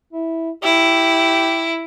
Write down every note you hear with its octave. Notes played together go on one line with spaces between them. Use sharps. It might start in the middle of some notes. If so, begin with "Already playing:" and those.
E4
E4 G4